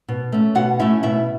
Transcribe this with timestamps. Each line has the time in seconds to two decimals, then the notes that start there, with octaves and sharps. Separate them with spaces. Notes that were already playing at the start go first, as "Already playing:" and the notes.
0.08 B2
0.32 A3 C#4
0.55 B2 F#4 F#5
0.79 A3 C#4 E4 E5
1.03 B2 E4 E5